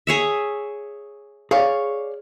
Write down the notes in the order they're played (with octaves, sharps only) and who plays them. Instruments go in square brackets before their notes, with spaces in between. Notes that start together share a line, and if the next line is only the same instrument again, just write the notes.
[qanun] G#4 C#5 E5
[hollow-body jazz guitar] G#4 C#5 D5 [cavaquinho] F5 C#6